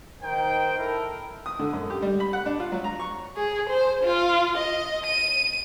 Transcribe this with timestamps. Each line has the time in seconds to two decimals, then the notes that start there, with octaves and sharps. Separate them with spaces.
0.22 D#3 D#4 C5 G5
0.78 E4 A4 A#4
1.46 D#6
1.59 D3
1.73 F#2
1.90 G4
2.02 G3
2.20 B5
2.33 F#5
2.46 D4
2.60 F4
2.72 F#3
2.84 A#5
3.00 C#6
3.37 G#4
3.70 C5
4.04 F4
4.58 D#5
5.06 D#7